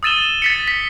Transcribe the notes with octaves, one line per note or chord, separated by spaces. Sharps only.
D#6 E6 A6 D#7 E7 G7
A6 B6 C#7
B6